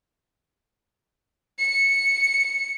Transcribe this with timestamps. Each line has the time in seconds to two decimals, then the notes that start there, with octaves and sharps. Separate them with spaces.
1.59 C#7